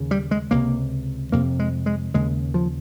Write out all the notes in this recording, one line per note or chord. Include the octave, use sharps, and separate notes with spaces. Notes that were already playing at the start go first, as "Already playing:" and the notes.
Already playing: D#2 C#3
G3
G#3
C#2 C3 A#3
F2 C3 A#3
G#3
G#3
D#2 C#3 G#3
F3